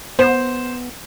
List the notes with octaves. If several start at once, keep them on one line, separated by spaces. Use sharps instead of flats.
B3 C5